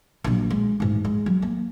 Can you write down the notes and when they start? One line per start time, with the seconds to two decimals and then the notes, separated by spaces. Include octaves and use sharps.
0.24 A#1 F#3
0.50 G#3
0.80 A1 G#2
1.05 G#3
1.26 F#3
1.42 A#3